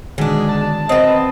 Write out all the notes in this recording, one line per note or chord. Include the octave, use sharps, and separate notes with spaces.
B2 D3 D#3 G#3 D4 G#4
A5
C4 B4 D#5 E5 F#5 A#5